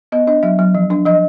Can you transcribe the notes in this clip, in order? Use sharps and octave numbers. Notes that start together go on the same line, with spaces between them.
B3 D#5
D4 D#5
F#3 E5
F#3
F3
D4
F3 D#5